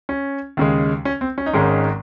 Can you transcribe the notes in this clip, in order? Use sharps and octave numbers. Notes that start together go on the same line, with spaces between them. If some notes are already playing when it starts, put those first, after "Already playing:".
C#4
D#2 C#3 G#3
C#4
C4
C#4
D#4
G#1 G#2 D#3 G#3 C#4